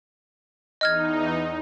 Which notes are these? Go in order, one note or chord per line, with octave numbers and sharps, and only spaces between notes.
E2 D#4 D#5 F6 G#6